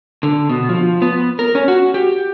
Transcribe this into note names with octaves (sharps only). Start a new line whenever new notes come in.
D3
B2
F3
B3
A#4
C#4
F#4
G4